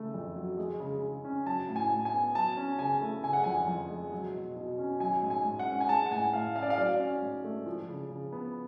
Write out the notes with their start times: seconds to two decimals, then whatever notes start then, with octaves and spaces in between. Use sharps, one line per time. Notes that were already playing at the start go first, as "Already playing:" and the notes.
Already playing: C#3 A3
0.14 F2
0.36 F#3
0.58 G#3
0.80 C#3
1.02 C#3
1.25 C#4
1.46 F#3 A5
1.69 A2
1.76 G#5
1.91 A2
2.05 G#5
2.13 B3
2.35 F#3 A5
2.57 C#4
2.79 C#3 G#5
3.01 A3
3.23 C#3 G#5
3.33 F#5
3.43 F2 G#5
3.68 F2
3.90 G#3
4.12 F#3
4.34 B2
4.56 B2
4.78 C#4
5.00 F#3 G#5
5.23 G#2
5.30 G#5
5.45 G#2
5.59 F#5
5.67 C#4
5.81 G#5
5.89 G#3 A5
6.06 F#5
6.11 A2 G#5
6.33 A2 F5
6.55 C#4 F5
6.63 D5
6.70 F5
6.78 F#3 D5
6.99 C#4
7.22 G#2
7.44 A3
7.66 F3
7.88 C#3
8.10 C#3
8.33 B3